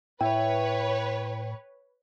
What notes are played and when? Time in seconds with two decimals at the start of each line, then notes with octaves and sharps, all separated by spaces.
0.21 A2 E4 B4 C#5 G5